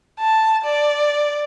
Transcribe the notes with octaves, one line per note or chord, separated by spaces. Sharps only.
A5
D5